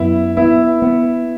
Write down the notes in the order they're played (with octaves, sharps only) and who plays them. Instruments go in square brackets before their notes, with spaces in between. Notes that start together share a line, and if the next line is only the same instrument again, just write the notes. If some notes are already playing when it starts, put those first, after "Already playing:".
Already playing: [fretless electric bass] F#2 B3 [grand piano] E4
[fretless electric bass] B3 [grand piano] E4
[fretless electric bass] B3